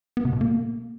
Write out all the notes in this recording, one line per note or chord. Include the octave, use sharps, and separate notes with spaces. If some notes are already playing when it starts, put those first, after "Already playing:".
B3
C3
B2
A#3